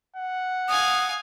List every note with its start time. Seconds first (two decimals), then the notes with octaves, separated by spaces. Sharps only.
0.16 F#5
0.69 F5 G#5 D#6